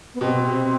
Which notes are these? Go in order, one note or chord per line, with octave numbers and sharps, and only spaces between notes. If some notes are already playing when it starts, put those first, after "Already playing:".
B3
B2 C4
C3